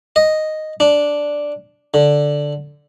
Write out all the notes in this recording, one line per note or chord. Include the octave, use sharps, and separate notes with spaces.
D#5
D4
D3